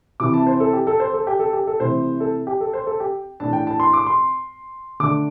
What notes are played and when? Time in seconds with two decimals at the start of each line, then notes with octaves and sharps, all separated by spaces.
0.20 C3 E3 C4 D6
0.34 A5
0.47 C5
0.60 A4
0.73 G4
0.87 A4
1.00 C5
1.14 A4
1.27 G4
1.39 A4
1.53 G4
1.67 A4
1.80 C3 E3 A3 C5
2.20 A4
2.47 G4
2.61 A4
2.73 C5
2.87 A4
3.00 G4
3.40 A2 E3 A3 D4 A5
3.53 G5
3.67 A5
3.80 C6
3.93 D6
4.07 C6
5.00 D3 A3 D4 D6